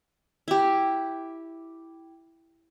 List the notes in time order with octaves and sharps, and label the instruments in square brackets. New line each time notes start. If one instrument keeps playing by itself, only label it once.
[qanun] E4 G4